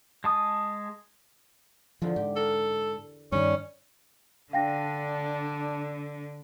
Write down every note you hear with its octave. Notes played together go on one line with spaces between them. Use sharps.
G#3 A5 D#6
E2 D3 F3 G#3
G#2 G4
A4 A#4
G2 D#3 G3 C#4
D3 D4 F5 G5 A#6